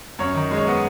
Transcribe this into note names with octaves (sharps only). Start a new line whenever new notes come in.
F#2 C#5
D#3
G#3
C#5
B3 D#5